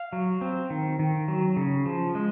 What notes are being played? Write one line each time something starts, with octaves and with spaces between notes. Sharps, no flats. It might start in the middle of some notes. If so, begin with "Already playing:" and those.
Already playing: F5
F#3
C4
D#3
D#3
F#3
C#3
F3
G#3